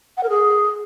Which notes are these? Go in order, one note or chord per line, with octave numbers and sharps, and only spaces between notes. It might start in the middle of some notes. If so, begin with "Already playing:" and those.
F#5
A#4
G#4